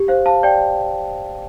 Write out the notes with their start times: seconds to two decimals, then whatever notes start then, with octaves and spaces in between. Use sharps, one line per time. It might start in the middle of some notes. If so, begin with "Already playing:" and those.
Already playing: G4
0.08 C5 F5
0.26 F5 A5
0.43 D5 G5